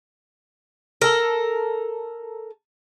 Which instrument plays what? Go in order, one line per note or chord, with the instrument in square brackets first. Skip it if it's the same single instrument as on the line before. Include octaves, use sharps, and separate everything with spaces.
[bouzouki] A4 A#4